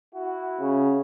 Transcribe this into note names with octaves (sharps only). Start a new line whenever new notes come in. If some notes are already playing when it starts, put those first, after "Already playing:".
E4 F#4
C#3